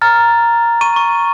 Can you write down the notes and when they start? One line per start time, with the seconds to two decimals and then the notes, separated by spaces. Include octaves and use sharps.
0.01 A#5 F6 A6
0.81 C#6 D#7
0.96 C#6